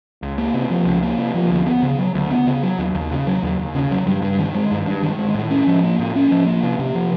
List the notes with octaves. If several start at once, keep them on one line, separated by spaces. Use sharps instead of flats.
C#2
A#3
C3
F3
C#2
A#3
C3
F3
D2
B3
C#3
F#3
D2
B3
C#3
F#3
D#2
D#2
C#3
F#3
D#2
D#2
C#3
F#3
G2
G2
D#3
G#3
G2
G2
D#3
G#3
A2
C#4
F3
A#3
A2
C#4
F3
A#3
C3
C3
F3